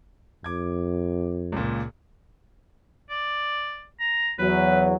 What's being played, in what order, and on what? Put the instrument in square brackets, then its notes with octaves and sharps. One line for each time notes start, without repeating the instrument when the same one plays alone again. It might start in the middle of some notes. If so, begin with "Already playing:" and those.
[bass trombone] F2 [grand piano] D6 G#6
[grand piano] C#2 A#2
[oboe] D5
A#5
[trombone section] E2 F#3 [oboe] B4